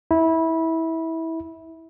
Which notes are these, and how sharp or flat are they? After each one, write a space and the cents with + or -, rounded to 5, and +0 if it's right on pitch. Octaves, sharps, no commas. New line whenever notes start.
E4 -20